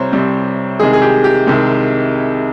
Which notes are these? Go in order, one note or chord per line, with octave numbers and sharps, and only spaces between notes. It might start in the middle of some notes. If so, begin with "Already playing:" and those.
Already playing: C2 C3 G3 C4 C5 C#5 A#5
C2 C3 G3 C4
C2 C3 D#3 G#3 G#4
G#4
G4
G4
C2 C3 D#3 G#3